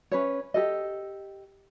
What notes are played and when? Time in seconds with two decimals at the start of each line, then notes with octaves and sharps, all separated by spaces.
0.11 C#4 B4 C#5
0.54 G4 A4 D#5